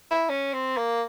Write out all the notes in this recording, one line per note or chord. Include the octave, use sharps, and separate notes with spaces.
E4
C#4
C4
A#3